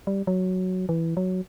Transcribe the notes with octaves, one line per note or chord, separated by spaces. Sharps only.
G3
F#3
E3
F#3